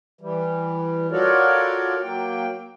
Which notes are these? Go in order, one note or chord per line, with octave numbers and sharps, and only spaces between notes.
E3 G3
F4 F#4 A4 A#4 C#5 D5
F#3 A#3 G5